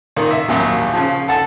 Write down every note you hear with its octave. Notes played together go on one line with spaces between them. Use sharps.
A#2 D#3 A#3
E5
A#1 D#2 F#3
C#3 F3
A4 F#5 A5